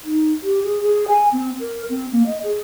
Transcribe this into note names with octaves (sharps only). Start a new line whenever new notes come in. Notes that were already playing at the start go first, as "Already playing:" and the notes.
D#4
G4
G#4
G#4
G#5
C4
A#4
C4
A#3
D#5
G#4